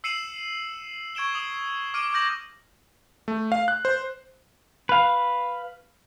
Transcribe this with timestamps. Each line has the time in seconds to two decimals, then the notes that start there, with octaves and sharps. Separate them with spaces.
0.04 E6 C7 C#7 D#7 E7 F#7
1.15 C#6 G#6 D7 E7 G7
1.35 D#6 F#7
1.94 D6 F6 D7 D#7
2.13 D6 F6 G6 A#6 F#7
3.28 A3
3.52 F5
3.68 F#6
3.85 C5
4.89 B4 F5